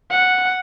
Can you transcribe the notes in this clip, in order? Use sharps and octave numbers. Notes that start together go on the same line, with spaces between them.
F#5